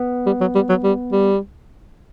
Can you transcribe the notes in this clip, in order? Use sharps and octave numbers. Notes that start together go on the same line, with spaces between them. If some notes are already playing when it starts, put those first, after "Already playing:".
Already playing: B3
G3
F#3
G3
F#3
G3
G3